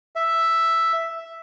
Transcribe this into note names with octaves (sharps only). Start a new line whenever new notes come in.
E5